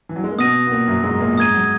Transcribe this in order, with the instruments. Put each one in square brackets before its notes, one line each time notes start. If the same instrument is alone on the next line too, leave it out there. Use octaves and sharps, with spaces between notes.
[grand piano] E3
F#3
G#3
A#3
[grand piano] B2 B3 [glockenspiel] D#6 A#6 D#7
[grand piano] B3
A#2 A#3
F#2 F#3
G#2 G#3
A#2 A#3
[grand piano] G#2 G#3 [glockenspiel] D#6 G#6 D#7
[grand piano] F#3